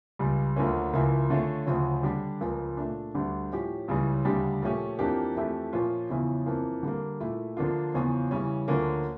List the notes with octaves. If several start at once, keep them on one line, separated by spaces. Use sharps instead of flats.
C#2 C#3 G3
D2 D3 F3 A#3 C#4
C#2 C#3 F3 A#3 E4
D3 A3 C#4 F4
D2 C#3 F3 C#4
D3 G3 D4 G4
C#2 C#3 F3 A#3
A#2 A3 D4
D2 D3 G3 D4
A2 F3 C#4 G4
C#2 C#3 E3 G3 C#4
D2 C#3 G3 D4 G4
A#2 F3 A3 C#4 G4
F2 E3 A#3 D4 G4
F2 E3 A3 E4 G4
A#2 F3 C#4 F4
E2 C#3 F3 C#4 E4
F2 E3 A#3
D3 G3 A#3
A#2 A3 E4
D3 F3 A#3 D4 F4
E2 C#3 F3 C#4 F4
C#3 E3 G3 C#4
D2 D3 F3 A#3 C#4